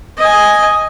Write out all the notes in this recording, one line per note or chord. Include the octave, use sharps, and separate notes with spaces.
D#5 G#5